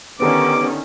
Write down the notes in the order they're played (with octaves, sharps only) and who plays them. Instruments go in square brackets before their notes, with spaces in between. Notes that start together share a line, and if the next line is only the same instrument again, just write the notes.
[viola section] D3 D#3 C#4 [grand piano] B3 G4 A#5 [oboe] D6